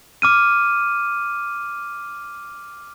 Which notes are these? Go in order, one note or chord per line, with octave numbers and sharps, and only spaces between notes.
D6 F6 D#7